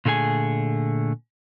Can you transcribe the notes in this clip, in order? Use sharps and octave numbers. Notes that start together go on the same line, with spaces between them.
A#2 D3 A3 G#4 G#5